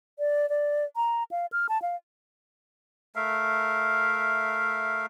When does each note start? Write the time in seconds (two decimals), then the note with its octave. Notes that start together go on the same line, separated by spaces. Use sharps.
0.19 D5
0.49 D5
0.96 A#5
1.31 F5
1.52 F6
1.69 A5
1.82 F5
3.16 A3 A#4 E5 F5